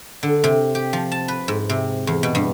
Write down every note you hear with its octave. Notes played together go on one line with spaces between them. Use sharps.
D3
C3
G4
F3
A5
B4
G#2
C3
E2
B2
G2